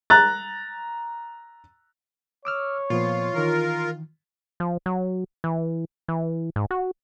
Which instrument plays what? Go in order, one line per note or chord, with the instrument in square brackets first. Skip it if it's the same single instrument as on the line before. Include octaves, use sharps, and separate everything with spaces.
[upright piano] A#5 F#6 A6
[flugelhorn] C#5 [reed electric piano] D6 E6 F6
[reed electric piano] A#2 F3 B3 [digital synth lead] F4
[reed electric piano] D#3 E3 [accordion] A#4
[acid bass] F3
F#3
E3
E3
G#2
F#4